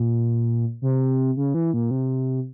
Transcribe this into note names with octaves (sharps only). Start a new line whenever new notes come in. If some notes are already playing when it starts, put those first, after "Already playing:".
Already playing: A#2
C3
C#3
E3
A#2
C3